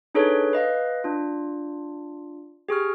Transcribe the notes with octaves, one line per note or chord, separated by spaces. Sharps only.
D4 D#4 G#4 A4 B4 C#5
B4 D#5 F5
D4 F4
G4 G#4 C#6 F6